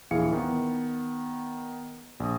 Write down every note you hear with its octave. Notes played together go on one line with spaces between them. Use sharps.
A#1 D#2 E3 G#4 F5 C#7
D#3 B3
A#1 D#6